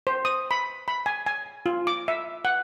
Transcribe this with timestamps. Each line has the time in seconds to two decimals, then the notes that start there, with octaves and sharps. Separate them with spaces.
0.07 C5
0.25 D#6
0.51 B5
0.88 B5
1.06 G#5
1.26 G#5
1.66 F4
1.87 D6
2.08 E5
2.45 F#5